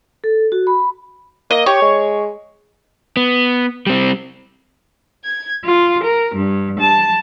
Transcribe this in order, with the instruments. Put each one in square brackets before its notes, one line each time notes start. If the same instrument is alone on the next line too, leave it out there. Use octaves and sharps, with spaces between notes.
[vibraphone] A4
F#4
B5
[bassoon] A#3 [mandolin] D#5
[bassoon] G4 [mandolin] C#5
[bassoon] G#3
[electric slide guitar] B3
G3 C4
[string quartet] G#6
F4
A#4
G2
A5